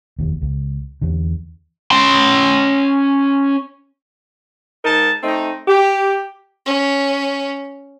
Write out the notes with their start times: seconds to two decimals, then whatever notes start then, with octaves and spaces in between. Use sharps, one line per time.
0.19 F1 D#2
0.42 C#2
1.02 E2 D3
1.91 C#4 C6
4.84 G#2 D#4 A#4 A5
5.23 A3 C4 D#4
5.67 G4
6.66 C#4